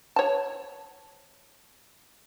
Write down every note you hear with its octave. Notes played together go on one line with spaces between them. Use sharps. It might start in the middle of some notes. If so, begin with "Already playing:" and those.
C#5 A5